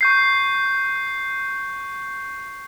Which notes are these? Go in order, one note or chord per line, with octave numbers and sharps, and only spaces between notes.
C#6 G6 C7